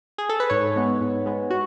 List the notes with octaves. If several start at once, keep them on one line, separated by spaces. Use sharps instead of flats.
G#4
A4
B4
G#2 C#5
G#3 B3
G#2
G#3 B3
F#4